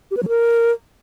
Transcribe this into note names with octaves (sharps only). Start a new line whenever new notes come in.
G4
B4
F#3
A#4